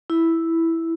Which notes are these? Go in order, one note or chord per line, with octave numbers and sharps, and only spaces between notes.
E4